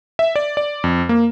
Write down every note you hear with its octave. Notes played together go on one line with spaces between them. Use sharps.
E5
D5
D5
F2
A#3